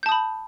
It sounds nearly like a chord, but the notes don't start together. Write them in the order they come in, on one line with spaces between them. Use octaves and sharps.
G6 A5 D#6 B5